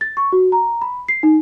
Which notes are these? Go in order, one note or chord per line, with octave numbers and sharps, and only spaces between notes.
A6
C#6
F#4
A#5
B5
C7
D#4